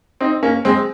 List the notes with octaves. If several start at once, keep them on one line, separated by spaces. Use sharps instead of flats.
C4 D#4
A#3 C#4
G#3 C4